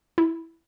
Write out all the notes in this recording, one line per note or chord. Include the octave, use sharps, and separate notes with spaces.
E4